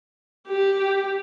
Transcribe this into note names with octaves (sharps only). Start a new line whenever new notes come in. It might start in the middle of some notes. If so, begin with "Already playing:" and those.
G4